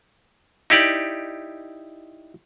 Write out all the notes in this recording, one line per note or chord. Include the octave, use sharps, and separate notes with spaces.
D#4 E4 G4 D5